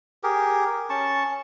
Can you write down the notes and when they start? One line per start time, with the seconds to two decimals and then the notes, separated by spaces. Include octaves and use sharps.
0.23 G4 G#4 A#4
0.90 C#4 A5 C#6